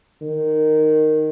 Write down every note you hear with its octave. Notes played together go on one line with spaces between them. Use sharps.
D#3